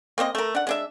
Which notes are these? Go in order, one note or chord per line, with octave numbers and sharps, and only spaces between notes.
A#3 C4 C5 D#5
A3 A#4
D4 F#5
G#3 D4 E5